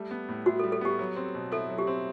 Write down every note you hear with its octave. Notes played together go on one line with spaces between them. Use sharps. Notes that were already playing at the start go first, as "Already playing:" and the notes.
Already playing: G3 A3
B3
A2
E4 F#4
A4
G3
A4
B3 G4
F#3
C4
B2
E4 A4
F#3
G4
C4